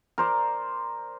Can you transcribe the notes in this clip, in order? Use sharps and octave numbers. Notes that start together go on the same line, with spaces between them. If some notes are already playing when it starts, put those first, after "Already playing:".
A#4 C5 D5